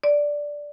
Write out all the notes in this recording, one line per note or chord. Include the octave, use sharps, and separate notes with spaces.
D5